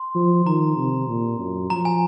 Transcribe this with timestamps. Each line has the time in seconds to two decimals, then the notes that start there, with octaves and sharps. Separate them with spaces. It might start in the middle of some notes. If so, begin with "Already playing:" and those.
Already playing: C6
0.15 F3
0.46 D#3 A#5
0.77 C3
1.08 A#2
1.39 F#2
1.70 F3 A#5
1.85 G#5